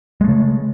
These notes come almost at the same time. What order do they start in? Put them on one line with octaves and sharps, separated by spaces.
G#3 A3 C#3